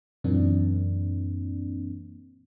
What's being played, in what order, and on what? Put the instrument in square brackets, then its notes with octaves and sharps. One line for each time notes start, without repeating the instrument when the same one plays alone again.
[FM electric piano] F#2 A#2 E3 A#3 C4 D4